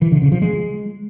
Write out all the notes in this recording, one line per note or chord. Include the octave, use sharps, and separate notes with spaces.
E3
D3
C#3
F3
G#3